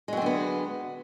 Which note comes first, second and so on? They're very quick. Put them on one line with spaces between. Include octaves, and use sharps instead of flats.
G#3 F#3 C4 D3 B3